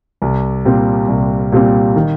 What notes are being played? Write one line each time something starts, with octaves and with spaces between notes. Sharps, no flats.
C2
A#2 G3 C4
C2
A#2 G3 C4
D#3